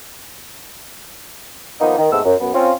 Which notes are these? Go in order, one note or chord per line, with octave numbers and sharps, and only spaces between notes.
D#3 F3 A#3 B3 D#4
D#3
G#2 C3 G#3 A3 B3 E6
F#2
F#2 B3
C4 C#4 F4